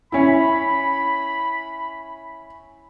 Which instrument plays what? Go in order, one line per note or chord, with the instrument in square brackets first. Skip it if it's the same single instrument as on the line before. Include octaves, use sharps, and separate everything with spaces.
[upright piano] C#4 E4 [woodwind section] B5